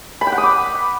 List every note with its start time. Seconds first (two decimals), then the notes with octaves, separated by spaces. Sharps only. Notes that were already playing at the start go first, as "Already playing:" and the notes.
0.21 B5
0.27 G5
0.32 F#5
0.38 D#6
0.43 D6